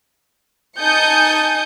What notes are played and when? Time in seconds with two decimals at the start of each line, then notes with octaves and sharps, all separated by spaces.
0.80 D#4 G#5 A5 D#6 G6 C#7